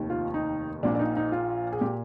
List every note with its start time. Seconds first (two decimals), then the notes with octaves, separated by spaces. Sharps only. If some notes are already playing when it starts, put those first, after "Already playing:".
Already playing: F1 D#2 D#3
0.10 F4
0.34 D#4
0.83 A#1 A#2 D4
0.95 D4
0.99 D#4
1.17 D#4
1.32 F4
1.72 G#4
1.81 A#2 G4